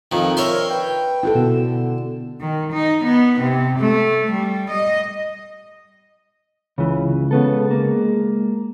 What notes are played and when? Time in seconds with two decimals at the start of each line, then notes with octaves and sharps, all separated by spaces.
0.12 F2 D#3
0.37 C4 D4 A#4 C#5 E5 C6
0.70 B4 G5
1.23 D2 D4 E4 F#4 A4
1.35 B2 D3 B3 E7
2.40 D#3
2.72 D#4
3.04 B3
3.40 C3
3.79 A3
4.31 G3
4.70 D#5
6.78 C#2 C#3 E3
7.31 C#3 G#3 B3 A4
7.71 A#3